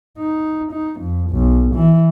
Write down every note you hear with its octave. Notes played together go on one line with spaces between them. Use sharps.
D#4
D#4
F2
B1
E3